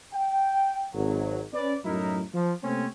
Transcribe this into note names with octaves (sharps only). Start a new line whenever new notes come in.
G5
G#1 F#3
C#4 B4 D5
F#2 A2 F#3 D#4 E4 A#4
F3
C3 A3 A#3 C4 C#4